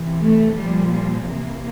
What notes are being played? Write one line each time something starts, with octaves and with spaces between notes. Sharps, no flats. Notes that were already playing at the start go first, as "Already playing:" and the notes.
Already playing: C3 E3
A3
A#2 F3 G3
G3
C3 E3 A#3